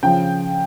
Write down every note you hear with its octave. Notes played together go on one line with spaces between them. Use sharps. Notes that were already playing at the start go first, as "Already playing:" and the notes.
C#3 F3 G5